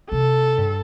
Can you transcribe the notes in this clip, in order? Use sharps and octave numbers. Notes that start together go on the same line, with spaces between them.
C3 A4
G2